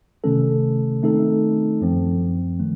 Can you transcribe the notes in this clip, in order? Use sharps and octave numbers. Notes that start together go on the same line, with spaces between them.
C3 D#3 A3 C#4 A4
D#3 A3 C4 D#4 A4
F#2 F3 C4
D#3 A3